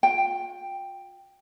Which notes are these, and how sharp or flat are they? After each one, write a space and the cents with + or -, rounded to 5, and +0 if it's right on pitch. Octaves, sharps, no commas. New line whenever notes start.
F4 +45 G5 +5